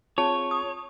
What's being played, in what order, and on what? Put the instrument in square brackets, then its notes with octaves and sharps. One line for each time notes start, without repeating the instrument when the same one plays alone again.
[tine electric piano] C4 F4 G#4 [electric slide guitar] C#5 [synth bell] A5
[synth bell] D#6